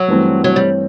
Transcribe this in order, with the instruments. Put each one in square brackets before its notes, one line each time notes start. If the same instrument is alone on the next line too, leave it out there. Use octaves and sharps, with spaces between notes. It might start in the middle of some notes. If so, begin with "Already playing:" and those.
Already playing: [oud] F#3
[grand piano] G2 E3 A3 C4
[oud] F#3
G3